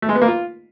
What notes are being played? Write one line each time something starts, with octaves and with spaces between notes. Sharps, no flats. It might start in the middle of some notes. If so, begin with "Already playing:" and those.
A3
G#3
B3
A#3
F4